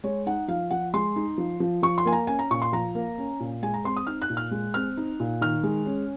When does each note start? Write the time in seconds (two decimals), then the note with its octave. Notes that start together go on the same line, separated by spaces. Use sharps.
0.04 G#3 C#5
0.26 D#4 F#5
0.48 F3 F5
0.71 F3 F#5
0.94 G#3 C6
1.16 D#4
1.38 F3
1.60 F3
1.83 F3 C#6
1.98 C6
2.05 A#3 G#5
2.12 A#5
2.27 C#4 G#5
2.39 A#5
2.51 A#2 C#6
2.62 C6
2.73 F3 A#5
2.95 A#3
3.18 C#4
3.40 A#2
3.62 G#3 G#5
3.74 A#5
3.84 C4 C6
3.97 D#6
4.07 D#4 F6
4.22 F#6
4.30 A#2
4.37 F6
4.51 G#3
4.74 C4 F6
4.97 D#4
5.20 A#2
5.41 D#3 F6
5.63 G#3
5.86 C#4